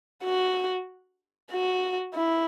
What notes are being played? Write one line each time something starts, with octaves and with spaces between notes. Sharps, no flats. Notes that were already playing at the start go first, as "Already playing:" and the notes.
F#4
F#4
E4